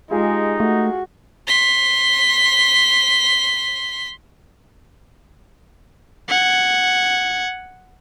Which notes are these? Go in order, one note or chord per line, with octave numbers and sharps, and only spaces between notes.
G#3 D#4 F4 G4 G#4
A3 F#4
C6 B6
F#5 G#6